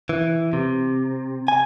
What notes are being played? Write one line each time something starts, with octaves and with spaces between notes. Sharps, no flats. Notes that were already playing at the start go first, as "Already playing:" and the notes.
E3
C3
G#5